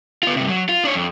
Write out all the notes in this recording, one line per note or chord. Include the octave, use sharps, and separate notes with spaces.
B3 F4
G2 C3
F#3
F4
D4 C#5
F2